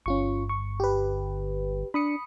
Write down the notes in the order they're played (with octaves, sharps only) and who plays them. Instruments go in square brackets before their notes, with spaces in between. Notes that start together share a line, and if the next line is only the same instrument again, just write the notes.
[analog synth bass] G1 [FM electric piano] C#4 F4 C#6
[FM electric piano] C#6
G4 B4
[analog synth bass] D4 [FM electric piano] B5 D#6 C#7